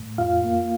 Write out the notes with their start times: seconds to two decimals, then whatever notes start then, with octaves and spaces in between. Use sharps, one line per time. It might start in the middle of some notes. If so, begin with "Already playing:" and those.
Already playing: A2
0.18 F2 F4 F5
0.44 A#3